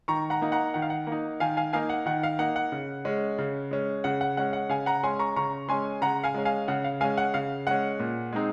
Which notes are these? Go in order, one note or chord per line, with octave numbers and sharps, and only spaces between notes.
D#3 A#5 C#6
F#5 A#5
A#3 D#4
F#5 A#5
D#3 F#5
F5
F#5
A#3
D#4
D#3 F5 G#5
F5 G#5
A#3 D#4 F5 G#5
F#5
D#3 F#5
F5
A#3 D#4 F#5
F#5
C#3
G#3 C#4
C#3
G#3 C#4
C#3 F#5
F#5
G#3 C#4 F#5
F#5
C#3 F5 G#5
F#5 A#5
G#3 C#4 G#5 C6
A#5 C#6
C#3 A#5 C#6
G#3 C#4 G#5 C6
C#3 F#5 A#5
F5 G#5
G#3 C#4
F5 G#5
C#3 F#5
F5
G#3 C#4 F5 G#5
F#5
C#3 F5
G#3 C#4 F#5
A#2
G#3 C4 D#4